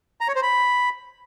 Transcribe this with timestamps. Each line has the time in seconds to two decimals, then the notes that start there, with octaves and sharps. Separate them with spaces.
0.21 A#5
0.28 C#5
0.35 C5
0.43 B5